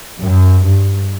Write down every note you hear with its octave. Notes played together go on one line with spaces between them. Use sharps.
F#2
G2